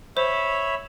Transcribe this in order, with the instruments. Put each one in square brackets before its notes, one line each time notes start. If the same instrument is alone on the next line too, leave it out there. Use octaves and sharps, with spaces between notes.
[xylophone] C5 [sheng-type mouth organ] C#5 E5 B5